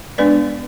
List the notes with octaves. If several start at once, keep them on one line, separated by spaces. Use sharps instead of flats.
G#3 B3 D4 B4 D5